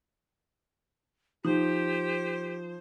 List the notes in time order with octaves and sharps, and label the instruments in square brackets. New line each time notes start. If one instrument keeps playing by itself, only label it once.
[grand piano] F3 [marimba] D#4 [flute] G4 [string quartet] C5